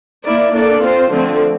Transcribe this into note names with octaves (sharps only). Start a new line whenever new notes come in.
A#3 E4 A#4 D5
A#3 D4 A4 D5
C4 F4 C5
D3 F3 A3 C4